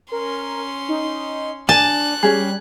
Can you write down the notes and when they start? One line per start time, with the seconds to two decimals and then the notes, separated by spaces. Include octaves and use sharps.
0.12 C#4 A#4 C6
0.89 D#4
1.69 D4 G#5 A5 F#6
2.23 G3 C#4 G#4